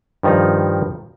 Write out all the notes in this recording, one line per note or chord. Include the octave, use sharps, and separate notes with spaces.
G2 D#3 F3 G3 D#4